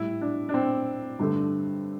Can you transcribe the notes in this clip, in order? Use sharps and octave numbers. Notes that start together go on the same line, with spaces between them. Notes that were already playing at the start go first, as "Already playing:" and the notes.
Already playing: A2 G3 E4
D4
D4
C4
G2 D3 A3